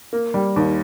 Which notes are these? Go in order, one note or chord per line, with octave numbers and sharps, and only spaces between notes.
A#3
G3
D#2